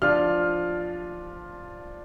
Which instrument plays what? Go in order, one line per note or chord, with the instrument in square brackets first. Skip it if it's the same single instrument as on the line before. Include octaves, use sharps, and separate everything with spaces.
[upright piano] F3 D4 F4 F6